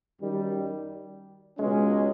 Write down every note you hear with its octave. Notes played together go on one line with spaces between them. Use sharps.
F#2 D#3 G3
C#2 B2 G#3 C#4